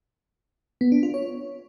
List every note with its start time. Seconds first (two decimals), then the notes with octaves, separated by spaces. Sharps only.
0.81 B3
0.92 D4
1.03 F4
1.14 C#5